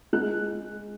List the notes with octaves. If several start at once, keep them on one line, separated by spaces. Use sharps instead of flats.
G#3 F#6